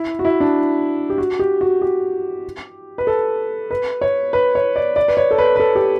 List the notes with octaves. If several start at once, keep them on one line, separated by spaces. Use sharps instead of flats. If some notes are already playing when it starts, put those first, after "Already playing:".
Already playing: E4
F#4
E4
D4
G4
F#4
G4
F#4
G4
B4
A4
B4
C#5
B4
C#5
D5
D5
B4
C#5
A4
B4
B4
A4
G4